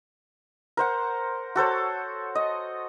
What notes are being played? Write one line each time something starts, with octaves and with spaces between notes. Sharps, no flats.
A#4 C5 F#5
F#4 A4 C5 C#5
D#5